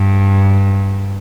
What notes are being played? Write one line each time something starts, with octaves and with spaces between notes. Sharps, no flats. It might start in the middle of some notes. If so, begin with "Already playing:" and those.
Already playing: G2